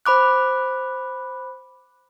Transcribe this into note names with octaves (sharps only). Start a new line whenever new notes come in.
C5 B5 D6 F#6